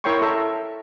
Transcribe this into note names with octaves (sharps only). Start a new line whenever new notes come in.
E4 A#4 C#5 G5 C6 C#6
A4 E5 A#5